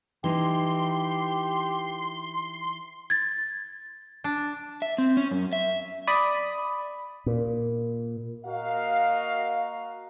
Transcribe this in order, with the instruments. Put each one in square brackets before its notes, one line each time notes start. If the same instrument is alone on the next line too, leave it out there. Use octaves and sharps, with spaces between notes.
[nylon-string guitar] E3 D#4 [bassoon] G4 [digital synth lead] C6
[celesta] G#6 A6
[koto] D4
[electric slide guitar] E5
C4
C#4
F#2
E5
[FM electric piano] D5 B5 D#6
[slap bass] A#2
[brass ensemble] A#3 F#4 A#4 D#5 F5